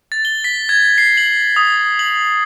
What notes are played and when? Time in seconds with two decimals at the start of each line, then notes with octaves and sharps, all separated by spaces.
0.12 A6
0.25 G7
0.44 B6
0.69 G#6
0.98 C7
1.17 F#7
1.56 D#6
1.99 F#7